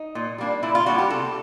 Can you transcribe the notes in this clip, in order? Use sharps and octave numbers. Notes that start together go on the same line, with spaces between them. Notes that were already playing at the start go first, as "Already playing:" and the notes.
Already playing: D#4
A#2
G3 A#3 D4
A#2 E4
F4
G3 A#3 D4 F#4
G4
C3 A4